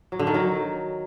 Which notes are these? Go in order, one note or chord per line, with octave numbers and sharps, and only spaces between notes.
F#3
D3
D#3
F#3